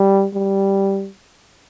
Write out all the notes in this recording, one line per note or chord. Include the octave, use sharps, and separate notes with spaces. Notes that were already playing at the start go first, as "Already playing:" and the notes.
Already playing: G3
G3